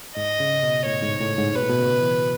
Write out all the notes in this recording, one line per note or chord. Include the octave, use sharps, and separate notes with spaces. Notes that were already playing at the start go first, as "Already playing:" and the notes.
G#2 D#5
C#3
B2
A2 C#5
G#2
A2
G#2
B2 B4
A2
B2
C#3
E3